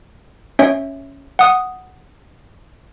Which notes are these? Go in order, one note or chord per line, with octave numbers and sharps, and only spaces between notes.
C#4 C#5 E5
F#5 D#6